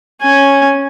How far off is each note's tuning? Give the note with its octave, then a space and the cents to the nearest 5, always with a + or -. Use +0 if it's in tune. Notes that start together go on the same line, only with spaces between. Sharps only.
C#4 -5 G#5 +0